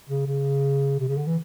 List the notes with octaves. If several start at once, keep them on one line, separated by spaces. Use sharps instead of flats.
C#3
C#3
C3
C#3
D3
E3